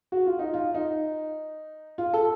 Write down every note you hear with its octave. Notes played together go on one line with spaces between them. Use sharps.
F#4
F4
D#4
F4
D#4
F4
A4